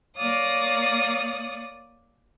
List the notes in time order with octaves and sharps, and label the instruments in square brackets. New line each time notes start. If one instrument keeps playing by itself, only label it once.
[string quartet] A#3 C#5 D5 F5 D#6